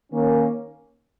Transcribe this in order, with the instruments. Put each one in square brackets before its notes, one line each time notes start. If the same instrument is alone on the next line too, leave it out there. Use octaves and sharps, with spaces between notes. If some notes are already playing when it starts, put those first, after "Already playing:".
[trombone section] D#3 A#3 C#4